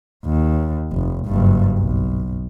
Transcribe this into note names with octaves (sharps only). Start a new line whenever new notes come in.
D#2
F1
F#1 G2
B1